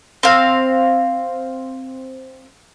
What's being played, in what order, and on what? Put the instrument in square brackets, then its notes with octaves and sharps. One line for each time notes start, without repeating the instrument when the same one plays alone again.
[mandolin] C4 F5